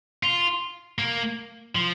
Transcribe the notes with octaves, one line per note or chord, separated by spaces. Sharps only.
F4
A#3
F3